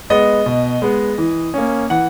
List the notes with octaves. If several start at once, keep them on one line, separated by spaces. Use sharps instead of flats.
G#3 B3 D#5
B2
G#3 B3
E3
A#3 C#4
E3 F#5